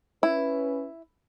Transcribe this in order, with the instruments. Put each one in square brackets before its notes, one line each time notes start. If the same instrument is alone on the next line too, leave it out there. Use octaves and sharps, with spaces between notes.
[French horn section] C#4 B4 [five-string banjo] E4